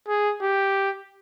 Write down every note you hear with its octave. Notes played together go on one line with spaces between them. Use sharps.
G#4
G4